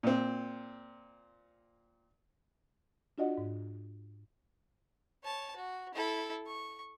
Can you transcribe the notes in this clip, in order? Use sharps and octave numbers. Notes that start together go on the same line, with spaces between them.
A#2 C4
D4 F4 F#4 D5 D#5 F#5
G#2
C#5 A5
F#4
E4 A4
C#6